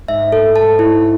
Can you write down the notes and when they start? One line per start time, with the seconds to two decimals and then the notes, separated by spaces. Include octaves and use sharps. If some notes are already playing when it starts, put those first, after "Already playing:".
0.08 G#2 E5
0.32 A4
0.56 A5
0.79 E4